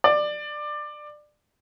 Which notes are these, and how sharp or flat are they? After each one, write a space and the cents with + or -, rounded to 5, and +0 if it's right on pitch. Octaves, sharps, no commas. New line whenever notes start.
D5 +20